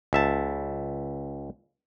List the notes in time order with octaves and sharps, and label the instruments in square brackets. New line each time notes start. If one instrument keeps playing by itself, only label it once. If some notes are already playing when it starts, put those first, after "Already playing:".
[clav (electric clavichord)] C#2 E5 A5